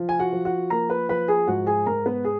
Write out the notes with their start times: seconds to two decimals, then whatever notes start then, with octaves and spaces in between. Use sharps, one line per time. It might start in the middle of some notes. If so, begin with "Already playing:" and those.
Already playing: F3
0.09 G#5
0.19 F#4 F#5
0.33 F3
0.45 F#4 F#5
0.70 A#3 A#4 A#5
0.90 B4 B5
1.09 F3 B4 B5
1.28 G#4 G#5
1.47 G#2 F#4 F#5
1.67 G#4 G#5
1.86 G#2 A#4 A#5
2.06 B3 B4
2.25 G#4